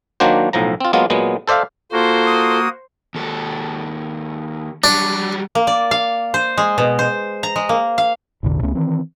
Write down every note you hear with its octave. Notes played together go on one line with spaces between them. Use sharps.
D#3 F#3 A#3 D4 F#4 C5
B1 A2 F3 A#5
C4 F4
F#3 G#3 A#3 B3 F4
A#2 F#3 G#3 B3
A4 C5 D5 E5 F5
A#3 F4 F#4 A4 C5
D#6
D#2 A4
F#3 G3 D4
A#3
D5
F5
C5
G#3
B2
C5
A#5
G#3
A#3
F5
A1 E2 B2 D3
C#2 A3 B3 C#4
D#3 E3 C4